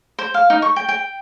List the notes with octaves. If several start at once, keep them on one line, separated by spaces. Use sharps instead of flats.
C5
F5
D#4
C#6
G5
G5